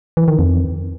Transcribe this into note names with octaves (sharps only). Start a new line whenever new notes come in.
E3
D#3
F2